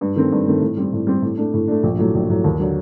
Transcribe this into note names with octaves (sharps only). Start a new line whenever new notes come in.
G2
D#3 A3 C4
G2
D#3 A3 C4
A2
G3 C4
A2
G3 C4
A2
A3 D4
A2
A3 D4
A#1
A2 F#3 A3
A#1
A2 F#3 A3
D#2
D3 F#3